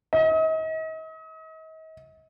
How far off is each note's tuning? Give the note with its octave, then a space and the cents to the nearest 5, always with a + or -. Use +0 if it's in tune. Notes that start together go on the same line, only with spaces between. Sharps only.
D#5 +40